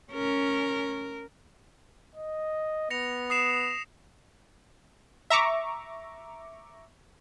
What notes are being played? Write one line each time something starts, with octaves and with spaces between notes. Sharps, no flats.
C#4 A#4
D#5
B3 A#6 C#7 F7
D#6 C7 E7
E5 A#5 C#6 D6